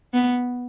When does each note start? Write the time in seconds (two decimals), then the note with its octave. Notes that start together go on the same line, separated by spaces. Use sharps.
0.13 B3